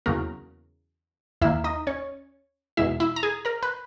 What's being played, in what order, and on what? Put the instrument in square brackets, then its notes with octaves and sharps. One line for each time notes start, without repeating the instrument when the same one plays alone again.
[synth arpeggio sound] E2 C#3 F#3 A#3 A#4
D#2 D#3 A#3 E4 E5
D#4 D#5
C#4 C#5
E2 B2 G#3 E4 E5
E4 E5
A#5
G#4 G#5
A#4 A#5
B4 B5